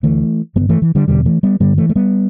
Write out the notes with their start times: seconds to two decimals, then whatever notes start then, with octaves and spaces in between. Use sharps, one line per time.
0.03 D2 D3 E3 A3
0.56 G2 G3 B3
0.60 D3
0.69 E3 A3
0.82 E3
0.95 D3 G3
1.08 E2 B2 D3 G3
1.26 E3 A3
1.43 G3 B3
1.60 G2 D3 G3 B3
1.78 E3 A3
1.89 A3
1.96 G3 B3